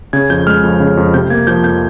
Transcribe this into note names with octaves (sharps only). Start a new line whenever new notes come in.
C#3 G#6
F2 G6
G#3 F6
F2
C#3
F2
C3 G6
A#3 G#6
F3 G6
F2 G6